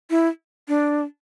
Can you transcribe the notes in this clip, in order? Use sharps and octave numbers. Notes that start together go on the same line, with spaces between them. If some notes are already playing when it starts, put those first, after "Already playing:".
E4
D4